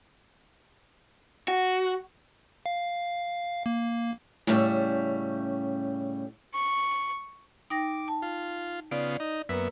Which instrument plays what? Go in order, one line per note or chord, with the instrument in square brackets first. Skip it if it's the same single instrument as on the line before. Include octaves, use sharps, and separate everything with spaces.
[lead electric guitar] F#4
[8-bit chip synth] F5
A#3
[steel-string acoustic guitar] A2 C#3 G3 C#4 E5
[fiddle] C#6
[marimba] D#4 G5 A#6 [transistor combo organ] D6
[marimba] A5
[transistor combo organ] F4
[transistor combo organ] C#3 B3 F4 [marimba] D5
[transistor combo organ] D#4
[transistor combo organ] F#2 B3 E5 [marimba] A#3 A#4 B4